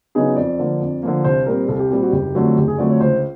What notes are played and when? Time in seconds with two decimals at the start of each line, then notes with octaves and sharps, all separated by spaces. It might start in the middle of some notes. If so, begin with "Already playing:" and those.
0.15 C#3 F#3 B3 D#4 G#4
0.36 F2 D5
0.59 D3 F3 A#3
0.80 F2
1.03 D3 F3 A#3
1.24 C2 C5
1.47 A#2 G3 C4 A#4
1.68 C2 A4
1.79 G4
1.90 A#2 G3 C4 G4
2.02 F#4
2.12 F#1 G4
2.35 F2 D3 F#3 A3
2.57 F#1 G4
2.68 G#4
2.78 F2 D3 F#3 A3 D5
2.90 C#5
3.00 C#2 C5